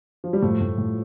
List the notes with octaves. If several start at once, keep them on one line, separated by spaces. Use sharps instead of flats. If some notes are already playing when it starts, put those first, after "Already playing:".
F3
G3
A2 F3 A3
A2
A2